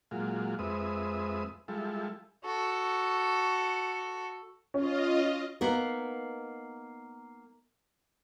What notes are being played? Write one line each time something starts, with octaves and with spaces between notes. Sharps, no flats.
A#2 F#3 G#3 F4
F2 G#3 C4 B4 E5 D#6
F3 G3 G#3 E4 A4
F#4 A4
C#4 F4 D#5
A#3 B3 D#4 A#4